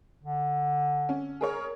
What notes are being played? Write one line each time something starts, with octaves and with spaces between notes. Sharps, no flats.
D3
C#4
G#4 A#4 C#5